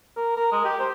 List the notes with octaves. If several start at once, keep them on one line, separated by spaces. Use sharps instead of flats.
A#4
A#4
G#3
G4
C5